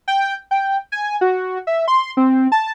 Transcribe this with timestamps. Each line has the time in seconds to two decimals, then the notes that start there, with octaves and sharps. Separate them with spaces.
0.08 G5
0.51 G5
0.92 G#5
1.21 F#4
1.67 E5
1.88 C6
2.17 C4
2.52 A5